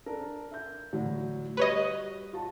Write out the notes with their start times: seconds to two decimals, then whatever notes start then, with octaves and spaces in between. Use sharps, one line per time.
0.06 D4 A4 A#4
0.51 E5 G6
0.93 A2 D3 F#3
1.57 G3 F#4 B4 C#5 D#5
2.33 F4 F#4 A5